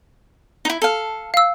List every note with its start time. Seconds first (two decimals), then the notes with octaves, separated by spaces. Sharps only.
0.65 D#4 E4
0.82 A4 F5
1.34 F5 E6